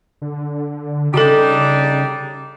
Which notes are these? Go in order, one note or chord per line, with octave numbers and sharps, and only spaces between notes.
D3
C#3 G3 D4 D#4 F#4 A4